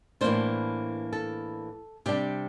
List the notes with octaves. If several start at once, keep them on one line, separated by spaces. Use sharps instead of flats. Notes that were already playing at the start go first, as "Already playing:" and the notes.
A2 E3 A#3 D4 C5
A4
C3 G3 D4 G4